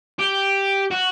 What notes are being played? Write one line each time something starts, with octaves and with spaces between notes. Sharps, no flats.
G4
F#4